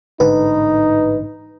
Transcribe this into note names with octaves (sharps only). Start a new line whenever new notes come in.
A1 G#2 D3 D#4 B4